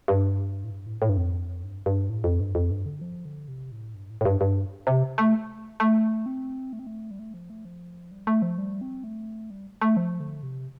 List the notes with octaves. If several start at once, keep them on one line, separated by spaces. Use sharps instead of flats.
G2
A2
G2
A2
A2
G2
F2
G2
G2
A2
F2
G2
F2
G2
D3
F3
D3
C3
A2
G2
A2
A2
G2
G2
C3
A3
A3
C4
A3
C4
A3
G3
A3
F3
A3
F3
G3
A3
F3
G3
C4
A3
G3
A3
F3
D3
C3